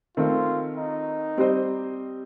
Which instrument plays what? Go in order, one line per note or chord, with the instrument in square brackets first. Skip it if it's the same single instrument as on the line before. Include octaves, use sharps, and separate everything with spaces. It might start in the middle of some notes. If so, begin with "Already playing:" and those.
[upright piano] D#3 A3 C4 [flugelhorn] F4
[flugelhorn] D#4
[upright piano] G3 C4 G4 C5 D#5